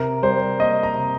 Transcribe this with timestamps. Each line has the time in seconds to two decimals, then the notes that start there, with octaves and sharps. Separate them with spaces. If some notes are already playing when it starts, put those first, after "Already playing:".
Already playing: C3 A#4
0.22 G3 C5
0.60 A#3 D#5
0.83 A#5
0.96 C3